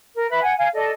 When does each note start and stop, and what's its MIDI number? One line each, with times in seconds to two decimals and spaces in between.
0.15 0.26 70
0.29 0.41 71
0.29 0.41 76
0.29 0.41 83
0.41 0.54 78
0.41 0.54 80
0.57 0.68 77
0.57 0.68 80
0.74 0.90 69
0.74 0.90 74
0.74 0.90 75